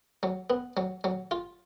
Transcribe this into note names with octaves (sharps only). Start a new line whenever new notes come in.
F#3
B3
F#3
F#3
F4